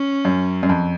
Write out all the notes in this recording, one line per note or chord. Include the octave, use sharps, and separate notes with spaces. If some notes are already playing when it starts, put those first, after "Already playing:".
Already playing: C#4
F#2
F#2
F2